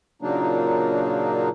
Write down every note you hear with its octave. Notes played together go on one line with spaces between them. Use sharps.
A#2 C#3 F#3 A#3 D4 D#4